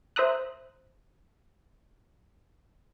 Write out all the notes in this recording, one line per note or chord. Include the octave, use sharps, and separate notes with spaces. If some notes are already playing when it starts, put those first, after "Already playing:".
C5 E5 A#5 D#6 F#6